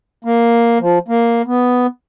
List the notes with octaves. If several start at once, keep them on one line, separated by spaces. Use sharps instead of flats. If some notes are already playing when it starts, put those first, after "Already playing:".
A#3
F3
A#3
B3